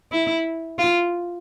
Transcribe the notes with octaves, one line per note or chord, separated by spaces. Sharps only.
E4
F4